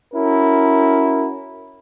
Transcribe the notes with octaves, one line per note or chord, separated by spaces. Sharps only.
C#4 E4 F#4 A#4